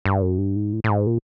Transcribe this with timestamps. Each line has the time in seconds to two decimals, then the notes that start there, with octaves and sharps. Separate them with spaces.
0.05 G2
0.22 F#2
0.38 G2
0.56 G#2
0.73 A2
0.84 A2
0.89 G#2
1.07 A#2